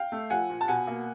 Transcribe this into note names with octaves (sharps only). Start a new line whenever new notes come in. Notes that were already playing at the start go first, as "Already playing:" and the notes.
Already playing: F5 G5
A3
F3 F#5 G#5
A#2
A5
B2 F#5 G#5
A#3